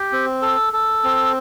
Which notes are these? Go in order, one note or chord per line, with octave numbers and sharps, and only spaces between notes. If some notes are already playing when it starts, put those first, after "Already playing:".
Already playing: G4
C4
A4
A4
C4